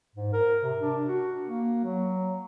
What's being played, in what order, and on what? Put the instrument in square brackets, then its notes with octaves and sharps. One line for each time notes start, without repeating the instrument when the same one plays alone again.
[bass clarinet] G#2
A#4
C3
D4
F#4
A#3
F#3